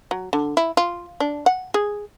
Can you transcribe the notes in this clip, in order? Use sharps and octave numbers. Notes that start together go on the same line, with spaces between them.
F#3
D3
E4
F4
D4
F#5
G#4